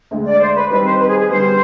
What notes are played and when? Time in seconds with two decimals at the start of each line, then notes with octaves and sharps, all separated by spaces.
0.11 D2 D3 G#3
0.26 D5
0.40 C5
0.55 B4
0.70 D#3 G3 C4 D#4 B4
0.85 C5
0.99 B4
1.09 G#4
1.19 G#4
1.29 D3 G3 B3 C5